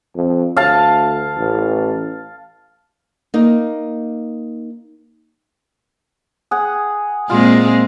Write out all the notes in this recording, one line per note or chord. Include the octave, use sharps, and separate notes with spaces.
F2
D2 F5 A5
A1
A#3 D#4
G#4 F#5
A#2 G#3 C4 F4